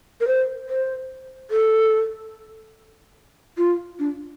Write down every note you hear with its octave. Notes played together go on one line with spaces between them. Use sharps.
A#4
C5
C5
A4
F4
D4